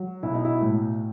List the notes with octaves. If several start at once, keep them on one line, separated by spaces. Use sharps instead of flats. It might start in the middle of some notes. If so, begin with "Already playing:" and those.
Already playing: F#3
B1 E4
D#4
E4
A2